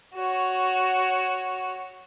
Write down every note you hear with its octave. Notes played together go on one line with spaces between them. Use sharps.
F#4 C#5